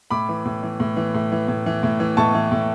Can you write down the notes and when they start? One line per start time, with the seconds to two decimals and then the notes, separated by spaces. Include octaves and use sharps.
0.10 A2 B5 D6
0.29 E3
0.45 A2
0.63 E3
0.80 A2
0.96 E3
1.14 A2
1.32 E3
1.48 A2
1.66 E3
1.83 A2
2.00 E3
2.17 A2 A5 C#6
2.34 E3
2.52 A2